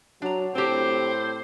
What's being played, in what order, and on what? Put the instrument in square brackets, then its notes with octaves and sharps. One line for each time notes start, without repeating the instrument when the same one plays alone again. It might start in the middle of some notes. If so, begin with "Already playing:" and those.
[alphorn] F#3 [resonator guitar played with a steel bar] D4 A#5
[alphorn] A2 [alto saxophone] C4 [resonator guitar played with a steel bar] G4 A5 [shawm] C5